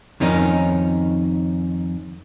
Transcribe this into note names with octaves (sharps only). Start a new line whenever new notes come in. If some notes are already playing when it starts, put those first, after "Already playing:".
F2 D#3 C#4 D#4